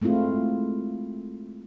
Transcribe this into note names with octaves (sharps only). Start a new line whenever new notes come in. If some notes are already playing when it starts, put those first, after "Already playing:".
G#3 A3 C4 E4 F4